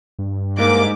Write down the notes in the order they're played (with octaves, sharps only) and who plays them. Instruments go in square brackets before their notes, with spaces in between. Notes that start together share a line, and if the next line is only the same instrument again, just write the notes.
[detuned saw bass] G2
[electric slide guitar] G#2 [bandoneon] A#3 [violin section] D6